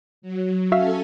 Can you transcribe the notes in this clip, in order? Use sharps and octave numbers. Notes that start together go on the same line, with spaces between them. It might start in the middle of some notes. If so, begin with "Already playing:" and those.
F#3
C#4 F#4 A4 E5 F5 G#5